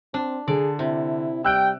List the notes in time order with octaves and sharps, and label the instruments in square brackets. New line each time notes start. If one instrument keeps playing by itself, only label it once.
[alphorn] C4 [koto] D4
[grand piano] D3 [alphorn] G#4 [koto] D5
[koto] C3 [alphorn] E4
[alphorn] G3 [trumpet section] G5 [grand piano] E6 F#6 D7